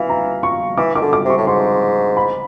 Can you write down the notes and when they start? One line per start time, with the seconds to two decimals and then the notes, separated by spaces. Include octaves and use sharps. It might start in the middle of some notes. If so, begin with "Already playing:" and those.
Already playing: E3 F5
0.10 A#5
0.43 C#6
0.77 E3 D6
0.95 D#3 D6
1.02 D3
1.13 D6
1.25 C3
1.30 C#6
1.37 A2
1.47 G#2 C6
2.17 B5